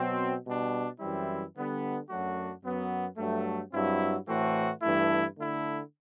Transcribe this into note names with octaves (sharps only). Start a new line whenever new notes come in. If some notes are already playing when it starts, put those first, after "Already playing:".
Already playing: B2 F#3 C4
B2 G3 D4
F#2 E3 G3 C4 E4
D3 G3 B3
F#2 F#3 A3 D4 F#4
F#2 F#3 B3
G2 F#3 A3
G2 F#3 C4 E4
A2 E3 A3 C4 F#4
G2 E3 A3 E4
D3 A3 E4